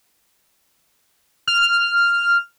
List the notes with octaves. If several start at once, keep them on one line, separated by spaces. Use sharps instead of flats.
F6